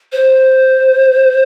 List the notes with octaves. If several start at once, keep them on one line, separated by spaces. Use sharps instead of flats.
C5